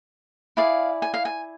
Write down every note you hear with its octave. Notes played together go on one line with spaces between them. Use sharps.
E4 G#4 D5 F5
G#5
F5
G#5